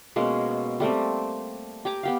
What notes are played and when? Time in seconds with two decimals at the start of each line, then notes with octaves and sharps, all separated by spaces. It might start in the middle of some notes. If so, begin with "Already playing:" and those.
0.16 B2 G#3 A#3 C#4
0.80 G3 A3 A#3 C4
1.85 G4 G#5 A#5 D6
2.03 B3 G4 F5